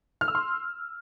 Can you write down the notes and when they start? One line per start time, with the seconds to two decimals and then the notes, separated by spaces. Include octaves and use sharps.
0.21 F6
0.28 E6
0.35 C6